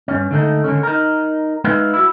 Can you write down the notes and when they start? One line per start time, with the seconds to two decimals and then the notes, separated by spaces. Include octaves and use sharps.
0.08 G2 C#4
0.31 D3 G#3 A3 D#4
0.64 D3 G#3 C#4
0.83 D#4 A#4
1.64 G#3 D#4 B4 E5 F5
1.94 E4 F#4